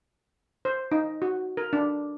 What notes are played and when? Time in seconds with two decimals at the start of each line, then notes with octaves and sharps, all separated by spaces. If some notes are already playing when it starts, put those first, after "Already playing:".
0.65 C5
0.92 D#4
1.22 F#4
1.57 A#4
1.73 D4